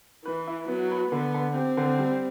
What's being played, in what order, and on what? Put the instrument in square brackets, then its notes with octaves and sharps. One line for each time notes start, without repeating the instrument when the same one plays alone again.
[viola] E3 [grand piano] B4
[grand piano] E4
[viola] F#3 [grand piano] B3
[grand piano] B4
[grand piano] D3 [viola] B3
[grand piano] D3
[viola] C4 [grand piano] G4
[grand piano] D3
G3